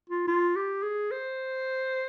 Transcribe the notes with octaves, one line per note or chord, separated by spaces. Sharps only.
F4
F4
G4
G#4
C5